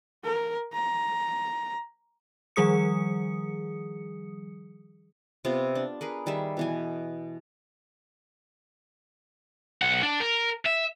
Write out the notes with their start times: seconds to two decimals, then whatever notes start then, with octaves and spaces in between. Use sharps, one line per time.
0.24 A#4
0.73 A#5
2.56 D#3 F3 G3 G#4 D#6 C#7
5.45 C3 B3 F4
5.75 D4
6.01 G#4 A#4 B4
6.26 D#3 G3 G#4 E5
6.57 B2 E3 G#5
9.82 B1 F#5
10.03 D4
10.20 A#4
10.66 E5